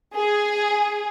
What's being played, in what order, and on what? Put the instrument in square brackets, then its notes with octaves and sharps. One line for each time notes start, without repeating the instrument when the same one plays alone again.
[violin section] G#4